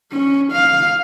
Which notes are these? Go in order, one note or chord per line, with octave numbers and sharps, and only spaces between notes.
C#4
F5